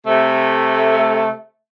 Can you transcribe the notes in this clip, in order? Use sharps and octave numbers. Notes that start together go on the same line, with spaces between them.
C3 A3